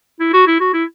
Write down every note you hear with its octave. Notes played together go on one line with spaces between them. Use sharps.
E4
F#4
E4
F#4
E4